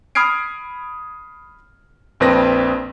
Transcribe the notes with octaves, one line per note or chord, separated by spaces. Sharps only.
B5 D#6 F6 G#6 C7 D7
A#1 F2 C4 B4 A#6